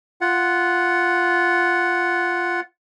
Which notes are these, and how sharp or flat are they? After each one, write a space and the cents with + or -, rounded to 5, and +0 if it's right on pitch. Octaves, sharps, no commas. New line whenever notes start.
F4 -5 F#5 +0